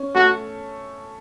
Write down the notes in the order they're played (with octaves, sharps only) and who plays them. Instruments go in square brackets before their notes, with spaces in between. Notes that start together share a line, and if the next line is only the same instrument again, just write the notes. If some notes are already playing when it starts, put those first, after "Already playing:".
Already playing: [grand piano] C#4
[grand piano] A3 [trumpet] F#4